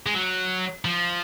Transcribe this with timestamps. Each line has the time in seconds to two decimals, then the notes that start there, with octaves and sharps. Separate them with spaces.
0.06 G#3
0.14 F#3
0.85 F3